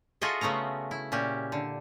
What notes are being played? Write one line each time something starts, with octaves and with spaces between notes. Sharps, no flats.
F4 F#4 G#4 A4 D#5 E5
C#3 A3 B3 C#4 A#5
E4
A#2 C#4 G4
D3